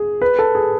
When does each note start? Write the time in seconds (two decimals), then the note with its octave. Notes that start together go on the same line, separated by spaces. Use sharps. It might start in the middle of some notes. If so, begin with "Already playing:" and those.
Already playing: G#4
0.22 B4
0.39 A4
0.55 G#4